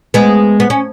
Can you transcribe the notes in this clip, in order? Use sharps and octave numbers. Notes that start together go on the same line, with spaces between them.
G#3 B3
B3
C#4